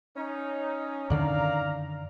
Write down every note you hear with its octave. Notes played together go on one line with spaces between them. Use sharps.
C#4 D#4
F#2 D3 D#3 D5 F5 A#5